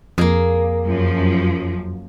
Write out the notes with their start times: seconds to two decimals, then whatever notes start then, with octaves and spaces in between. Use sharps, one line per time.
0.18 F2 A#3 G#4
0.87 F#2 F3